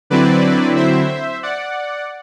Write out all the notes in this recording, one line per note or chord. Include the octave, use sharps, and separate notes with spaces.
D3 F#3 C4 E4 B4 D5
C5 E5
D5 F#5